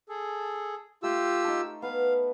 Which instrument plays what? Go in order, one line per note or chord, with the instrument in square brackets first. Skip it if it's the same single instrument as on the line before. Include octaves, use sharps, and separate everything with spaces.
[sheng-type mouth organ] G#4 A4
[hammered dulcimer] A3 [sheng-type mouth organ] F4 G4 E6
[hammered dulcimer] D#4 A4
[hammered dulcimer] B3 B4 F#5 [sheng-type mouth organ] F5